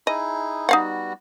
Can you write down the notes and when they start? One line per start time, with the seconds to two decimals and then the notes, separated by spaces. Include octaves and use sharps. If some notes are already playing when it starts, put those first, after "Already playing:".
0.07 D#4 E4 G#4 D#5
0.69 G3 B3 D#4 F#4 F5 F#5